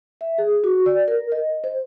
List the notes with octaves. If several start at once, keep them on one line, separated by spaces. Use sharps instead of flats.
E5
G#4
F#4
D5
A#4
D#5
C5